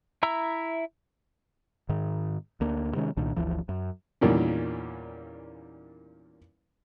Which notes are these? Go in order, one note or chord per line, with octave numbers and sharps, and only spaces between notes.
E4 E5 A#5 E6
G#2 D#3
D2 A#3 D4
C3 D#3 G#3 C#4
C2 A#2 D#3 D4
G1 D2 E3 F3
F#2
E2 A#2 D#3 G3 A#3 C#4